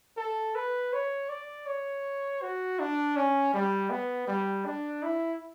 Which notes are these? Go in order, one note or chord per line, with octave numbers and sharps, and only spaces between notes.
A4
B4
C#5
D5
C#5
F#4
D4
C#4
G3
B3
G3
D4
E4